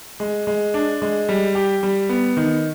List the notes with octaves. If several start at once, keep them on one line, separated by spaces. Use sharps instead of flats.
G#3
G#3
D4
G#3
G3
G4
G3
B3
D#3